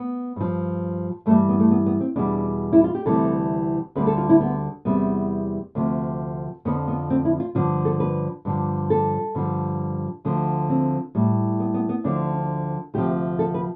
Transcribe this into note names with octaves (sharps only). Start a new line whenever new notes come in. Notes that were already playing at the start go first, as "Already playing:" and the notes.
Already playing: B3
G2 F3
G2 E3 G3 A3
B3
A3
B3
B3
C4
E2 B2 G3 D4
E4
F4
G4
D2 C3 E3 G3 A4
D2 D3 G3 B4
A4
F4
E4
B3
E2 C3 G3 B3
D2 C3 F3
F2 D3 F3 B3
B3
C4
E4
F4
G2 D3 F3 F4
A4
B4
G2 D3 F3
A4
G2 D3 F3
D2 D3 F3
C4
A2 G3
B3
B3
B3
D2 D3 F3 D4
D2 C3 F3 G4
A4
B4